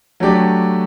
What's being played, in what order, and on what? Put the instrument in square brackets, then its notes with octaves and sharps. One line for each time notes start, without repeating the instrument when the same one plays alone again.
[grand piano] F#3 A3 D4 G4